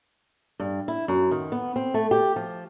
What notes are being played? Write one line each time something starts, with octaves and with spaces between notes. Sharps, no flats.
G2
E4
F#2
D#3
B3
C4
A3
G4
F3